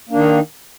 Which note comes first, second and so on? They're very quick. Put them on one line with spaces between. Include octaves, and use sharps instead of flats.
A#3 D4 D#3 D#4